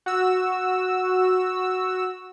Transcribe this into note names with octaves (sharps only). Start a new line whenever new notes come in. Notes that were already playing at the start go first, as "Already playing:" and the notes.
F#4 E6